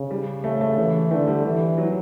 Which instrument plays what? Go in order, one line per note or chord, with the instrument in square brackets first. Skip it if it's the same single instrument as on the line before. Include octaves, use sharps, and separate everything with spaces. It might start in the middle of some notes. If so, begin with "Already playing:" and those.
Already playing: [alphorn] C#3
[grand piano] G3
A3
A3
[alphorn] E3
[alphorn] D3 [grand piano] A3
[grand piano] G3
[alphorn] E3
[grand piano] F#3